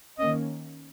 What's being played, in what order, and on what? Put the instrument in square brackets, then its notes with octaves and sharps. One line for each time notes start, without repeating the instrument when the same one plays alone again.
[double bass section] D#3 A#3 C#4 [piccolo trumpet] D#5